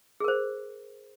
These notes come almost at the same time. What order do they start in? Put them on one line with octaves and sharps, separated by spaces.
G#4 A#4 C5